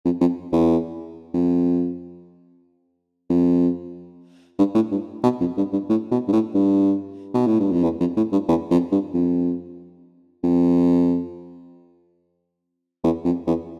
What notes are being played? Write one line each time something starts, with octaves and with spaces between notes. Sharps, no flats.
F2
F2
E2
F2
F2
G2
A2
G2
B2
F2
G2
G2
A2
B2
G2
A2
G2
B2
A2
G2
F2
E2
F2
A2
G2
E2
F2
G2
F2
F2
E2
F2
E2